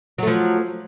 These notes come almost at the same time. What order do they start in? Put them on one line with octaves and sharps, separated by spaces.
F#3 A3 F3